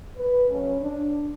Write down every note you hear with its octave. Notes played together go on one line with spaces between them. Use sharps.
B4
C#3 F#3 A3 C#4
D4